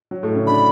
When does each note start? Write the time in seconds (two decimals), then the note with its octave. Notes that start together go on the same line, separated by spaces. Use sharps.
0.11 F#3
0.23 A2 A3
0.35 C#3 C#4
0.47 D3 D4 B5